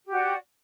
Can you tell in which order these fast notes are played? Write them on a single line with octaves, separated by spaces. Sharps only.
G4 F#4 D5